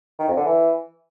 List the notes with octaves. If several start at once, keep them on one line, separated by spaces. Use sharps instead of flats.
D#3
F2
D3
E3